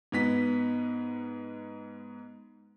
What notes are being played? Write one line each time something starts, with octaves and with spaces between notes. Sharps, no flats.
G#2 B3 B6